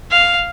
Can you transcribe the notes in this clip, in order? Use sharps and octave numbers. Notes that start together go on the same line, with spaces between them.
F5